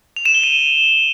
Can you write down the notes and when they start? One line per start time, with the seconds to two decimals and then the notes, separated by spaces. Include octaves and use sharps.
0.16 F7
0.25 E7
0.34 G7
0.43 D#7